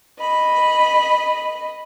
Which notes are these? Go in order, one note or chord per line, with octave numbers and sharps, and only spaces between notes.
D#5 B5